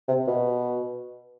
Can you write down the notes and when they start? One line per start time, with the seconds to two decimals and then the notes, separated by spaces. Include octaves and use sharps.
0.08 C3
0.27 B2